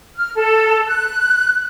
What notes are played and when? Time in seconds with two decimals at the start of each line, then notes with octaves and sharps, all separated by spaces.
0.17 F6
0.36 A4
0.86 F#6